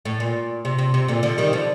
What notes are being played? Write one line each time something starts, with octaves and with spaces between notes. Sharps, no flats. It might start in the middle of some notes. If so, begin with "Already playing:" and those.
A2
A#2
C3
C3
C3
A#2 D3
D3 F3
D#3 G3
D3 F3